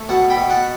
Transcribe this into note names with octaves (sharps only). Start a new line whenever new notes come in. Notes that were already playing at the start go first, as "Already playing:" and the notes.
Already playing: A3
B2 F#5 A5
G5 B5
B2
F#5 A5